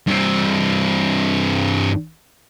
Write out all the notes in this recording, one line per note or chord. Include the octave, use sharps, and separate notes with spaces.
G2 C4